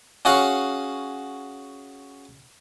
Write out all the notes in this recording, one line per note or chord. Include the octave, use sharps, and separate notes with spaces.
C#4 F#4 G#4 C#5 F5 F#5